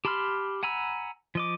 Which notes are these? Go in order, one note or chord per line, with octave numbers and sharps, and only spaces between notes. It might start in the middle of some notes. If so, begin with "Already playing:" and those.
G4 A5 B5 C6 F6
F#5 G#5 A#5 B5 E6
F3 D#5 D6